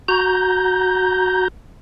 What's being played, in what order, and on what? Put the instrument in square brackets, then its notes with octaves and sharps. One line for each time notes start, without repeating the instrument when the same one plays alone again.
[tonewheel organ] F#4 A#5 G6